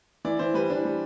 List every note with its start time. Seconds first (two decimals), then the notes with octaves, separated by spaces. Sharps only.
0.25 E3 D5
0.39 E3 C5
0.54 G3 B4
0.70 E3 D4
0.85 G3